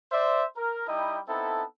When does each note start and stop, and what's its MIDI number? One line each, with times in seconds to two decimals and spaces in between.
0.12 0.44 72
0.12 0.44 74
0.12 0.44 76
0.57 0.88 70
0.88 1.19 55
0.88 1.19 63
0.88 1.19 64
0.88 1.19 75
0.88 1.19 79
0.88 1.19 87
1.29 1.63 59
1.29 1.63 60
1.29 1.63 63
1.29 1.63 64
1.29 1.63 69